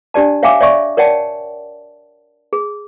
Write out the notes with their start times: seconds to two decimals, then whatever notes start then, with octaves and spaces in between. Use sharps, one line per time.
0.14 D4 G4 D5 A5
0.43 C#5 E5 F5 G5 G#5 D6
0.60 C#5 D5 E5 C#6
0.97 A#4 C#5 D5 F#5 G5 A5
2.53 G#4